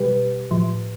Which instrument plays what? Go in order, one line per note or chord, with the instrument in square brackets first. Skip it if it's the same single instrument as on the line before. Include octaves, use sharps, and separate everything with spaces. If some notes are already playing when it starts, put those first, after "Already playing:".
Already playing: [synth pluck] B2 G3 G4 B4
A2 F3